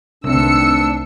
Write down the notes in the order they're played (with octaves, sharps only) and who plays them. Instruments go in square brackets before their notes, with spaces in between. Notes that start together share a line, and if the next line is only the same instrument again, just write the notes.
[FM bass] C2 [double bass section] D#3 A3 C4 [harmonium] D4 [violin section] E6 C#7